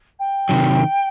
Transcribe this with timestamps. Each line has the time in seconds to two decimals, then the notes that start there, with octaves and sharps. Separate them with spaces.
0.19 G5
0.49 C3 D#3 F#3